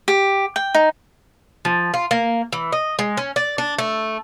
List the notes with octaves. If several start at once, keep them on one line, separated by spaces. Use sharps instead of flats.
G4
G5
D#4
F3
F4
A#3
E3
D#5
G#3
C#4
D5
D4
A3